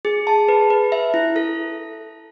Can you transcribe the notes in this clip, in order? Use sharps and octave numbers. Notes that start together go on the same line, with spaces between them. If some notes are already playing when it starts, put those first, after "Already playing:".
G#4
A5
B4
B4
E5
E4
A4